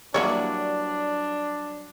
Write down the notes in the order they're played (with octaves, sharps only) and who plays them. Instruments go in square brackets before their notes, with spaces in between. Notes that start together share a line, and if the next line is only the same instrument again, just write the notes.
[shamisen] E3 A#3 C#5 [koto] F#3 G3 [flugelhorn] D4